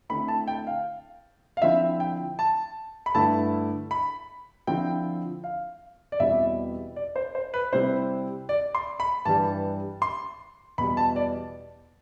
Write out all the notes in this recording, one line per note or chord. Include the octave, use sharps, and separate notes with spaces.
D3 A3 C4 E4 B5
A5
G5
F5
F5
D3 F3 C4 E4 E5
G5
A5
B5
G2 D3 A3 E4 A5
B5
D3 F3 C4 E4 G5
F5
D5
E2 B2 G3 C4 E4 E5
D5
C5
C5
B4
C3 G3 C4 E4 C5
D5
C6
B5
G2 E3 G3 A5
C6
E2 B2 G3 B5
A5
D5